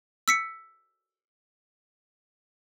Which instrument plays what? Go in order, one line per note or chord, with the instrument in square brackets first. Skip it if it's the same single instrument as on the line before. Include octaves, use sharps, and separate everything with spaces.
[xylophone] E6 B6 C#7